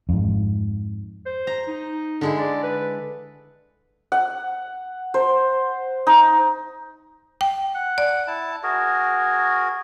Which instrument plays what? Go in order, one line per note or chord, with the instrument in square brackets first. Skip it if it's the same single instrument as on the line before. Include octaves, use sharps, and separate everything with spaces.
[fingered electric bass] F2 G#2
[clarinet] C5
[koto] A#5
[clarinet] D#4
[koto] D3 G#3 E4
[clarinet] D5
B4
[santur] F#5
C5
D#4
[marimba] G5
[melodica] F#5
[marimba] D5
[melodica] E4 A5
F#4 G#4 A#4